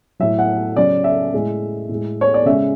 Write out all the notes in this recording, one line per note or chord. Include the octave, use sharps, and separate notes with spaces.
A2 F#3 E5
F#5
C#3 F#3 D5
E5
A2 G#3
A2
G#3
C#5
D5
C#3 G#3 E5